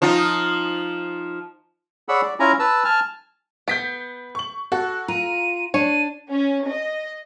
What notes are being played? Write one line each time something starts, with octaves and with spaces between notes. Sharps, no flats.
F3 D#4 F4
G#4 C#5 D5 F#5 B5 E6
D5
C#4 E4 F4 G#5 A#5
B4 A5 E6
G#5 A5 F6
B3 G6 B6 D7
C#6 F#7
F#4 A4 F#6
F4 A#5 D#7
D4 C#5 D#7
C#4
D#5